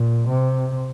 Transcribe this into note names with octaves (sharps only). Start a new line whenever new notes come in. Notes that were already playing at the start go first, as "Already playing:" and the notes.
Already playing: A#2
C3